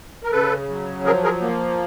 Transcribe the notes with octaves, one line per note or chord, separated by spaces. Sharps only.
A#4
C#3 A4 B4
F#3
F3 G#4 A#4
G#4 A#4
A#3